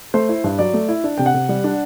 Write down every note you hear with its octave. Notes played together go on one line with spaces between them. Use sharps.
A3 C5
E4
G2
F#3 D5
A3
E4
D4
C3 G5
F#5
C3
G3
D4